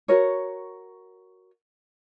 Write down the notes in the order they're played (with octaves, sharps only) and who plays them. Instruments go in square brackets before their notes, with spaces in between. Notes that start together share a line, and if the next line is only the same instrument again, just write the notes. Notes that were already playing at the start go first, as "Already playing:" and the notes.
[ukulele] F#4 A#4 C#5